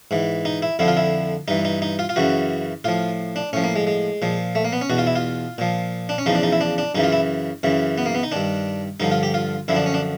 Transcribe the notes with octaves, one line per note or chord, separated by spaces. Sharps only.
G#2 E3
D#4
E4
F2 D3 F3 E4
F4
E4
G2 E3 D#4
D#4
D#4
F4
F4
F#2 C#3 E3 F#4
A2 F3 F4
D4
A2 F3 C#4
A#3
G#3
G#3
A#2 F3
A3
A#3
B3
C#4
E2 B2 F#4
F4
E4
F4
A#2 F3
D4
C#4
E2 C#3 F3 D#4
D4
D#4
E4
D4
D4
F#2 C#3 E3 D#4
F4
E4
F#2 C#3 E3
B3
A#3
B3
D#4
G2 D#3 D4
G2 D3 F3 D#4
F4
G4
F4
F#2 D3 F3 E4
D4
C#4
D4